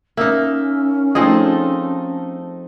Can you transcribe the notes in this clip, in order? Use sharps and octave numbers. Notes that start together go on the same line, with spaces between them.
A#3 C#4 D#4 E5
F3 A3 C4 D#4 G#4 D#5